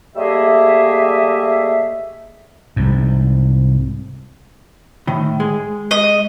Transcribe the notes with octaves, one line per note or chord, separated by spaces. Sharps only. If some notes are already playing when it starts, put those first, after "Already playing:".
G3 A3 A#3 G#4 D#5 E5
C2 G#2
A2 D#3
G#3
D#5